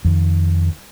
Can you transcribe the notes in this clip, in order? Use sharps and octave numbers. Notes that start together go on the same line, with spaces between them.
F2 D#3